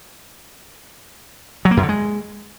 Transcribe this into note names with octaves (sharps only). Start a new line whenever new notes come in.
F#3
A#3
F#2
D3
G#3